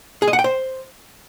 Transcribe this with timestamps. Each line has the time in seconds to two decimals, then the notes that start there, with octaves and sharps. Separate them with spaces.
0.22 G#4
0.28 D#5
0.33 F#5
0.39 G5
0.44 C5